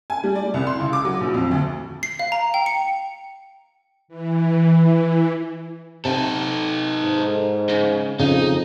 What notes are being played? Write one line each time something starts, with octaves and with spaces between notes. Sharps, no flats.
G#5
G3
D5
C2
C6
C#2
D6
F#3
A#1
F2
D2
C7
F5
A#5
G5
C#7
E3
C3 D#4 A4
G#2
C#3
F2 C#3 D#4 D#5